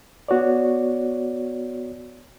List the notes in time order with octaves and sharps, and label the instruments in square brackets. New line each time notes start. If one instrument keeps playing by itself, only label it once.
[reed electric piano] B3 F#4 C#5 D5